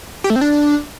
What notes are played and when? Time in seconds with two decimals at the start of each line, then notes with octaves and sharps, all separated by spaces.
0.24 G4
0.30 A3
0.36 C4
0.41 D4